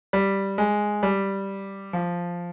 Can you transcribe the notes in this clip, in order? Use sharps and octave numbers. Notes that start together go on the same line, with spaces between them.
G3
G#3
G3
F3